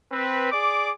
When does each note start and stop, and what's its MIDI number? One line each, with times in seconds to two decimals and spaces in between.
0.12 0.48 60
0.12 0.48 71
0.51 0.90 68
0.51 0.90 74
0.51 0.90 86